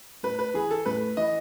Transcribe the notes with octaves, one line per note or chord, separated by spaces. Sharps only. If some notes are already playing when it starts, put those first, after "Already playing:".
A2 B4
B4
E3 G#4
A4
A2 B4
E3 D#5